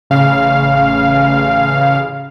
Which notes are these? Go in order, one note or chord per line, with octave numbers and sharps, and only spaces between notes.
A1 C#3 F5